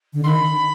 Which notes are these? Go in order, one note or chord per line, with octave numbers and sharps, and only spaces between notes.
D3
D#3 B5 C6